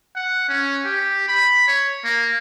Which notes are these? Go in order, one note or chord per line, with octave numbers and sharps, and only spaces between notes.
F#5
C#4
G4
B5
C#5
A#3